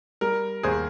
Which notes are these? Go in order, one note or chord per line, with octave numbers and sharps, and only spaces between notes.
G3 A#4
D#2 G#4 C5